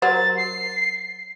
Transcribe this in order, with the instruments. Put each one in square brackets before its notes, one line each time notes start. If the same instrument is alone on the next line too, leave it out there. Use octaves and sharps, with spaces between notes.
[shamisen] F#3 A#4 C5 [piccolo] A6
[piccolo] C7